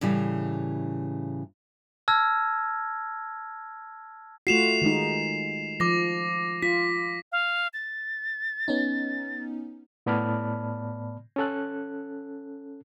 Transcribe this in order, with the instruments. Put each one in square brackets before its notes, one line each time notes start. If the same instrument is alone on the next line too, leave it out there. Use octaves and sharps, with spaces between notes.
[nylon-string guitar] A2 C#3 E3 G3
[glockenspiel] A5 E6 F6 G#6 A#6
[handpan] A3 F4 F#4 [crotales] C7 E7 F7
[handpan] D#3 G#3 D#4
[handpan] F3 [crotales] D6 A#6
[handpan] F4 [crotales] B6
[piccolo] F5
A6
[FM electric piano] B3 C#4 D#4
[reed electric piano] A2 B3 D5 A5 B5 F6
C#4 A4 F#6